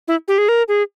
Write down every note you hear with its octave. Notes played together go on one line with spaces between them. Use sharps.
E4
G4
G#4
A#4
G#4